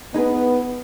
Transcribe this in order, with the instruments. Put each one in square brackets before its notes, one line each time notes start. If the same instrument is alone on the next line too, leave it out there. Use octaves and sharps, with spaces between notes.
[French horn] B3 [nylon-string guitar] D#4 G#4 B4